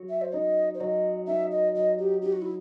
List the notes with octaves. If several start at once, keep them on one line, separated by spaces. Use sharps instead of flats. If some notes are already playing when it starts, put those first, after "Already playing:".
Already playing: F#3
E5
C5
D#4 D#5
C5
F#3 D#5
D#4 E5
D#5
F#3 D#5
G4
D#4 G4
F#4
E4